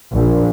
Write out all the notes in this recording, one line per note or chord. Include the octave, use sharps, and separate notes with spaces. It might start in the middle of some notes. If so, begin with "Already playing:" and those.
A#1